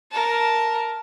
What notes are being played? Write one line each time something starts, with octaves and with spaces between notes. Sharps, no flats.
A#4 A5